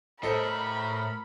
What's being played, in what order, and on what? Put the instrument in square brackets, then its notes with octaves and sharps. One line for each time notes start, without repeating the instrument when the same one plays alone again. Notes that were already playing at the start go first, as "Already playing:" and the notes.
[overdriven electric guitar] A2 [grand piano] A4 C5 D#5 [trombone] A#4 [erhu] B5